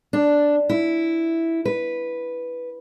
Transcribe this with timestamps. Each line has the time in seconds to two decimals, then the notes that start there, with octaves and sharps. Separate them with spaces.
0.13 D4
0.70 E4
1.65 B4